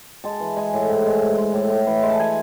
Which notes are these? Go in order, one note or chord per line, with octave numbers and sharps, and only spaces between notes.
G#3 A5
E3
G#3 G#5
A2
G#2
G#3
G#2
G#3
A2
A2
E3
G#3
A5
G#5